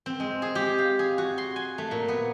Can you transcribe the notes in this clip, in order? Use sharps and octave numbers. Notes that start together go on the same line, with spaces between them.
C4
G#3
G#4
G4
F5
G#4
F#4
C6
G#5
A3
A#2
B3